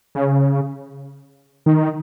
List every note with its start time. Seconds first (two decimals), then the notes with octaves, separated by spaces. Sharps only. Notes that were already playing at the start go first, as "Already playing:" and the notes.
0.15 C#3
1.66 D#3